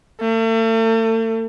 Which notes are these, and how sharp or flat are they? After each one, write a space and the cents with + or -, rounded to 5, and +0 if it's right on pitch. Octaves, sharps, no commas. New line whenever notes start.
A3 +40